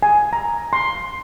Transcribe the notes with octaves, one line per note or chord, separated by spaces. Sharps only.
G#5
A#5
C6